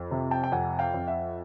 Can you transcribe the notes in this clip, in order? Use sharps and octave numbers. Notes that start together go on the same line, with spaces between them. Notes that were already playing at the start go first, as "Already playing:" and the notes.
Already playing: F2
C3
G5 A5
G5
F2 F#5 G#5
F5 G5
F2
E5 F#5